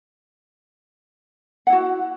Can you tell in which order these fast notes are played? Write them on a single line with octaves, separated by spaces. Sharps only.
F#5 E4 F#4